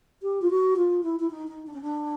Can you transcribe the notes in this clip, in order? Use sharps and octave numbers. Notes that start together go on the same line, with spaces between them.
G4
F4
F#4
F4
E4
E4
D#4
D#4
D4
C#4
D4